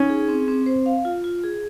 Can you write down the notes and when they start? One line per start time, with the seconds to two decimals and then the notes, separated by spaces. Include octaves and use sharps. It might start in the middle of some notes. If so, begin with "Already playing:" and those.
Already playing: C#4 D#4
0.10 G#4
0.28 C4
0.48 C4
0.66 C5
0.86 F5
1.05 F4
1.24 F4
1.43 G#4